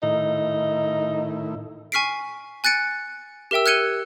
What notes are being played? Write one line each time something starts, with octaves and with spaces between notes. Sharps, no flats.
A2 D#3 D#4 E4
G#5 C#6 F6 B6 C7 D7
G#5 F#6 A6 C#7 D7
G4 A#4 E5 G5 E6
F6 F#6 G#6 C#7 D#7 G7